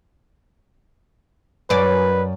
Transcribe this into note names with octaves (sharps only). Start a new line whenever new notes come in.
F#2 B4 D5